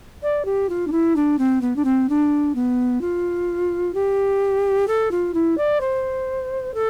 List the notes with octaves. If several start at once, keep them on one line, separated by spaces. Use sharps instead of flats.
D5
G4
F4
D4
E4
D4
C4
B3
D4
C4
D4
B3
F4
G4
A4
F4
E4
D5
C5
A4